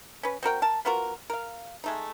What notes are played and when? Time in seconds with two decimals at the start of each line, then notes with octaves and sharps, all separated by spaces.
0.23 C#4 B4
0.43 C4 F#4 A#4 G5
0.62 A#4 A5
0.85 B3 F4 F#4 A#4
1.30 A#4 F5
1.84 G#3 A3 D#4